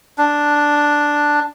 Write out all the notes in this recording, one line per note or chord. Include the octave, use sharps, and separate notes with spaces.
D4